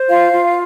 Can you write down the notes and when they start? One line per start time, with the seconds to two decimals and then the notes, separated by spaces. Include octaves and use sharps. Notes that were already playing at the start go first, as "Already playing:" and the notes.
Already playing: C5
0.09 F4 F5
0.32 F4